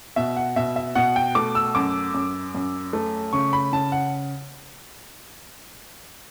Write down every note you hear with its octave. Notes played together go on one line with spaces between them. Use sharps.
B2 E5
F#5
B2 E5
E5
B2 F#5
G5
A3 D6
E6
F#2 D6
F#2
F#2
A3
C#3 C#6
B5
C#3 A5
F#5